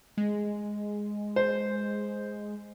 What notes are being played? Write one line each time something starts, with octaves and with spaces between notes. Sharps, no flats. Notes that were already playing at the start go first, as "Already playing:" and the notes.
G#3
C5